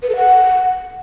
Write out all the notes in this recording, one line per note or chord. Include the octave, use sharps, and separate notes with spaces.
B4
A4
F#5